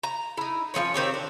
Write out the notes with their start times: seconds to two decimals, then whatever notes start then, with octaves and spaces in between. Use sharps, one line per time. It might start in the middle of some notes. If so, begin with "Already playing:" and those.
0.03 A#5
0.37 D#4 E4
0.74 F3 B3 C#4 C#5
0.94 D#3 C4 G4 C#5
1.14 D4